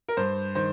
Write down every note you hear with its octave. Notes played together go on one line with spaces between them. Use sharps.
A#4
G2 C5
D#3 C5